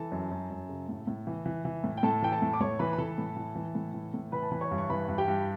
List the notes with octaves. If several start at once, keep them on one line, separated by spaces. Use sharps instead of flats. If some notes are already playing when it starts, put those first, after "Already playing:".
Already playing: E3 A4 A5
F#2
F#2
F#2
C#3
A2
A2
E3
E3
E3
A2
G5
A2 A4 A5
E3 G5
A4 A5
A2
D6
A2 C#5 C#6
E3 B4 B5
B5
E3 A4 A5
A2
E3
E3
A2
E3
A2
E3 B4 B5
A5
E3 B5
C#5 C#6
G2
C#6
E3 B4 B5
G2
G4 G5
G2